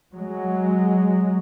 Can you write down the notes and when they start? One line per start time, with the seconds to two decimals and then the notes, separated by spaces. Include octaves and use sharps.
0.14 F#3 G#3